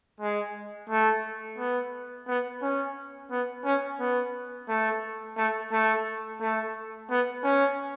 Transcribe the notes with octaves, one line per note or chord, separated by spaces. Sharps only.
G#3
A3
B3
B3
C#4
B3
C#4
B3
A3
A3
A3
A3
B3
C#4